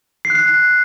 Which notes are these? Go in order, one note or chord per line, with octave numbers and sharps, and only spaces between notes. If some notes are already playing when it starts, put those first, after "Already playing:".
C7
F#6
C7